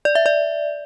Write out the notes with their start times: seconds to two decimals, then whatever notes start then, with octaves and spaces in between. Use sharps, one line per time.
0.05 D5
0.15 E5
0.26 D5